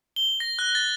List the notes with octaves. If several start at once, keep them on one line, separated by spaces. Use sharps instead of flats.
G7
A#6
F#6
A6